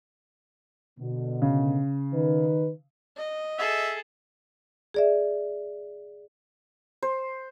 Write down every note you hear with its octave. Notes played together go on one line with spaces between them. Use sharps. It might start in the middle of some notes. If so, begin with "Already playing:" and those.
B2 D3
C#3
D#3 D#4 B4
D#5
G#4 A4 E5
G#4 D5 E5
C5